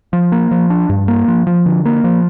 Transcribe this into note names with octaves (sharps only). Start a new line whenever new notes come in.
F3
A#3
F3
D4
G2
A#3
F3
F3
D3
A#3
F3